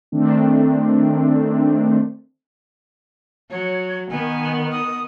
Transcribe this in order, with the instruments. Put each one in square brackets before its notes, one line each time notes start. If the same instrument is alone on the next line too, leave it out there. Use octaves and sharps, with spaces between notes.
[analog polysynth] D#3 A3 C4 D4
[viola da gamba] F#3 [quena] C#5
[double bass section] D#3 [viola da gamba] B3 [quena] G#5
[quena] D#6